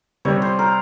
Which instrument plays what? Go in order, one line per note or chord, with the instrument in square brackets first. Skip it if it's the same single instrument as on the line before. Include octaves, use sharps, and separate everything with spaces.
[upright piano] C3 G3 C4 [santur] C#5
[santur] C5
A#4